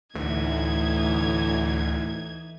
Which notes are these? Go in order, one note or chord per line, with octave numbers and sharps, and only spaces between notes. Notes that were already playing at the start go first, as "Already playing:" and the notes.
D2 A2 E3 D#4 G#6